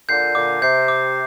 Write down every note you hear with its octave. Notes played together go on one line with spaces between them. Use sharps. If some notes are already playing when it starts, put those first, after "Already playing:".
A#2 D3 G6 C7
A#2 D3 D6
C3 G6 C7
D6